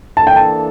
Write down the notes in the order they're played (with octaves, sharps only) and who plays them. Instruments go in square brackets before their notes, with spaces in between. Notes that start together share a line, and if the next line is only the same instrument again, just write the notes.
[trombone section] E3 A#3 D4 A4 [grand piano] A5
[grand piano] G5
A5